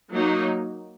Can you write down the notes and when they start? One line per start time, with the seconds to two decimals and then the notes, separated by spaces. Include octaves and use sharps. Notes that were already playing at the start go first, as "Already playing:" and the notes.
0.13 F#3 A#3 D#4